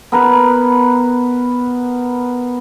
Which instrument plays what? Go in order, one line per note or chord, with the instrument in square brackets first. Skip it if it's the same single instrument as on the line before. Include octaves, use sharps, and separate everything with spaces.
[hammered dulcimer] B3 A#4 B4